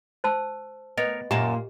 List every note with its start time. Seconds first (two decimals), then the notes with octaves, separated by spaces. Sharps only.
0.24 C5 A5 E6
0.98 B3 A#4 C#5 D#5
1.31 F#2 A#2 A#3 G4 A5